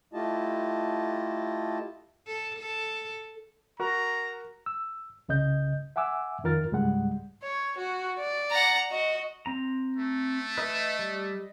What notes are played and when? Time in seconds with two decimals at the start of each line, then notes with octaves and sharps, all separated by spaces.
0.14 A3 E4 F4 G4 D#5 A5
2.27 A4
2.59 A4
3.80 F#4 A#4 A#5
4.66 E6
5.29 C2 C#3 D#5 G6
5.96 E5 F#5 G#5 D6 E6
6.44 F2 D#3 F4 A#4 F6 A6
6.72 C#2 G#2 G3 G#3 F#5
7.43 C#5
7.78 F#4
8.19 D5
8.51 F#5 A#5
8.92 F#4 D#5
9.46 C4 A#5
9.97 A3
10.57 B4 D#5 E5
10.99 G3